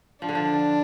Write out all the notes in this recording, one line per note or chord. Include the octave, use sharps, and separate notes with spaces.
F3 D4
D3
F3